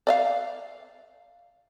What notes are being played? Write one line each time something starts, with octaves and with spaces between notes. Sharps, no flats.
D5 D#5 F5